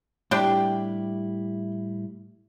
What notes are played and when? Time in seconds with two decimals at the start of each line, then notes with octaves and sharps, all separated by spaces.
0.31 A2 G3 D4 E4 G4 G5